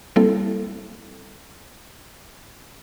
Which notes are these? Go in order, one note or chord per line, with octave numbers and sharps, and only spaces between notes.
G3 A#3 C4 E4 A4